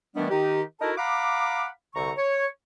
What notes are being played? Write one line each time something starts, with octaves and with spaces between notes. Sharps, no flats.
D#3 E3 G3 A3 B3 D4
D#3 D#4 G4
D#4 E4 F#4 A4 A#4 A5
F5 F#5 A#5 B5 D6
C2 D3 A#5 C#6
C#5